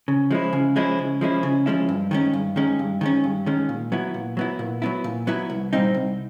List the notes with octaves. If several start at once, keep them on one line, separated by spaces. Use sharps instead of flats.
C#3
F3 G#3 C#4 E4
C#3
F3 G#3 C#4 E4
C#3
F3 G#3 C#4 E4
C#3
F3 G#3 C#4 E4
G2
D#3 G#3 C#4
G2
D#3 G#3 C#4
G2
D#3 G#3 C#4
G2
D#3 G#3 C#4
A#2
F#3 B3 E4
A#2
F#3 B3 E4
A#2
F#3 B3 E4
A#2
F#3 B3 E4
C2
A#2 G3 C4 D#4
C2